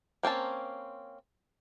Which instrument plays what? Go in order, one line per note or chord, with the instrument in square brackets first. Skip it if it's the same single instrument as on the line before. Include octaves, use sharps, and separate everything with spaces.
[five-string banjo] A#3 C4 C#4 A5